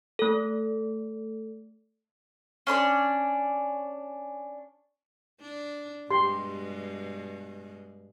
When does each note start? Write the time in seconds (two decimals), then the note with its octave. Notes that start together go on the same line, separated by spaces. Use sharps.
0.19 A3 A4
2.67 C#4 D4 C5 D5
5.41 D4
6.11 G2 B2 G#3 G4 C6